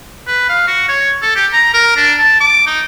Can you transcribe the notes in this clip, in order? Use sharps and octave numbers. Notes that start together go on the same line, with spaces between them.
B4
F5
F#4
C#5
A4
G4
A#5
A#4
D4
A5
D6
D#4